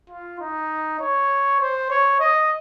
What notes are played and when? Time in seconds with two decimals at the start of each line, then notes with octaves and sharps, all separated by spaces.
0.10 F4
0.40 D#4
1.00 C#5
1.60 C5
1.90 C#5
2.20 D#5